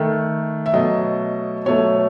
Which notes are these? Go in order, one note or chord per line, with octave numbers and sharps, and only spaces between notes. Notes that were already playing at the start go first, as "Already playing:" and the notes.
Already playing: D#3 A3
E5
B2 F#3 A3 D#5
B2 F#3 A3 C#5